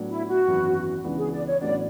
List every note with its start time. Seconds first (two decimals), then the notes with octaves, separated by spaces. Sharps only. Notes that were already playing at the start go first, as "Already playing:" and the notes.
Already playing: A2 F#3 B3 D4
0.09 E4
0.28 F#4
0.47 G#1 F#2 E3 B3 E4
1.04 C#2 C#3 E3 B3 D4
1.18 G#4
1.33 D5
1.47 C#5
1.61 A1 A2 F#3 B3 D4 D5